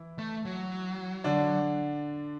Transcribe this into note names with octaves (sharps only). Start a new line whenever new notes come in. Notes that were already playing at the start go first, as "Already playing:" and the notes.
Already playing: E3 E4
A3
F#3
D3 D4